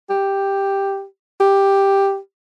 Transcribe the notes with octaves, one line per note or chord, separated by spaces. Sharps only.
G4
G4